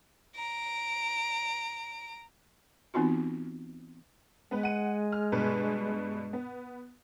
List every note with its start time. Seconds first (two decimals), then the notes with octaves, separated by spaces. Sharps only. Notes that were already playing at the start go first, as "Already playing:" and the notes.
0.36 A#5 D7
2.94 E3 B3 C4 D#4 F4 F#4
4.51 G#3 B3 B4
4.63 F#5 D#7
5.12 F6
5.32 G2 B2 B4
6.33 B3